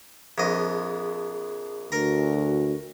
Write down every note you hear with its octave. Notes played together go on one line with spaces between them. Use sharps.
A#1 F2 G#4 D#5
D2 F#4 A#4 A#5